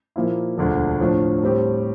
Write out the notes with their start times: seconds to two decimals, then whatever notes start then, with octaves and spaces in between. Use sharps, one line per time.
0.16 A#2 F3 A#3 E4
0.58 E1 D2 D3 F3
1.00 A2 F3 A3 D4
1.42 A2 G3 C4 G4